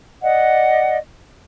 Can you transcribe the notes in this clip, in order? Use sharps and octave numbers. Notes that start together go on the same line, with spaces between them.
D5 D#5 F#5